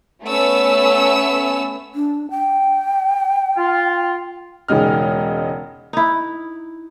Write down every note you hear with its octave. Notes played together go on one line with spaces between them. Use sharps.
A3 B3 C#4 E6
D4
G5
F4
E1 C#3 G#3 D#4 F6
D#4 E4